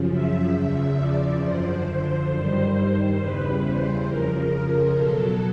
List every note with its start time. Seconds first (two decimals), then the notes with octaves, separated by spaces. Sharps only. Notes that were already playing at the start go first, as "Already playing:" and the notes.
Already playing: F#2 C#3 F3
0.09 E5
0.53 E2 C#3 F3
0.97 D5
1.41 F#2 D3 F3 C5
2.30 G2 D#3 G3
3.18 E2 C#3 E3 G3 B4
3.62 C5
4.07 F2 C#3 F3 A#4
4.95 B2 F#3 A4